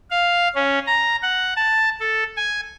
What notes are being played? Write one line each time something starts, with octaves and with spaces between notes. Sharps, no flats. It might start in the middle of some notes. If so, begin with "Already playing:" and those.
F5
C#4
A#5
F#5
A5
A4
G#5